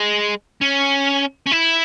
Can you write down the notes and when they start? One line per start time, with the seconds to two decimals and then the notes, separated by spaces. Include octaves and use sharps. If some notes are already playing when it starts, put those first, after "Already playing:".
Already playing: G#3
0.61 C#4
1.47 C#4
1.52 E4